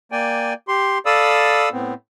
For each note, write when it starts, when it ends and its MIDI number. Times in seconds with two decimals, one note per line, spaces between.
0.12 0.54 58
0.12 0.54 74
0.12 0.54 79
0.12 0.54 80
0.68 0.98 67
0.68 0.98 84
1.06 1.69 69
1.06 1.69 74
1.06 1.69 77
1.06 1.69 83
1.06 1.69 87
1.06 1.69 88
1.72 1.94 45
1.72 1.94 59
1.72 1.94 60